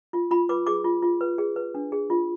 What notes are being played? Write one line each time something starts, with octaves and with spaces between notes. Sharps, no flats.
F4
F4 B5
B4 D6
G#4 D6
F4
F4
B4
G#4
B4
D4
G#4
F4